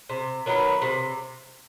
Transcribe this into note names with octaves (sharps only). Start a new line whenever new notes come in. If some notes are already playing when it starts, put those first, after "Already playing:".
C3
D#3 F#3 B3
C3